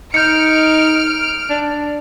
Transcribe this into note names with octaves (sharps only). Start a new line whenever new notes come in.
D#4 F6 G6 C#7 D7
D4